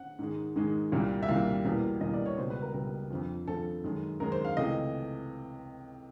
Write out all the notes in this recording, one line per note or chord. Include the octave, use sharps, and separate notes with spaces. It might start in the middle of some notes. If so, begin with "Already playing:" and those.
Already playing: F#5
G#2 D#3 G#3
G#2 D#3 G#3
C2 A#2 G3 A#3
E5
C2 A#2 G3 A#3 F5
E2 B2 G3 A#3
E2 B2 G3 A#3 D#5
D5
C#5
C#2 B2 G3 C5
B4
A#4
C#2 B2 G3 A#4
F2 D3 F3
F2 D3 F3 A4
F#2 D#3 G#3
F#2 D#3 G#3 A#4
C5
F5
C#2 C3 E3 A3 D#5